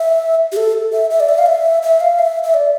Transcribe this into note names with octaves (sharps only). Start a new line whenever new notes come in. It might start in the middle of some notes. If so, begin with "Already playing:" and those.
Already playing: E5
G4
A4
E5
E5
D5
E5
F5
E5
E5
F5
E5
E5
D5